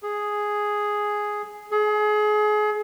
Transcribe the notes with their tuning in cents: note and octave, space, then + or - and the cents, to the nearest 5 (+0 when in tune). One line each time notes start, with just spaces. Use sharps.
G#4 +0
G#4 +30